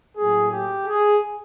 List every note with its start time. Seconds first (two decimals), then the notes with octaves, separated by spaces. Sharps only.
0.17 A2 F#3 A#3 G#4
0.51 G4
0.86 G#4